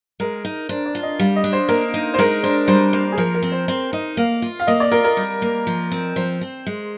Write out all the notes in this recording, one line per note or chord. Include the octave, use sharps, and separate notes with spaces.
G#3 A#4
D#4
D4 C5
D5
F4
D#5
G3 F5
D#5
D4
C5
A#3 A#4
D#4
C5
G#3 A#4
D4 C5
G3 C5
A#3 C5
G#4
F3 A#4
A#4
C4
C5
C4 C5
D#4 D#5
A#3 F5
F4
F5
A#3 D#5
D5
F4 A#4
A#4
G3
A#3
F3
C4
F3 C5
C4
G#3